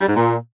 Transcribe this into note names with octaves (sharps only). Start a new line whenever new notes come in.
G3
G#2
A#2